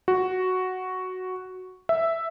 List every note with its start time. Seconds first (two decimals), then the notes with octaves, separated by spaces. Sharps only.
0.08 F#4
1.89 E5